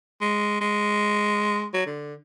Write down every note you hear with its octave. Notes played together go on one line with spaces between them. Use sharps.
G#3
G#3
F#3
D3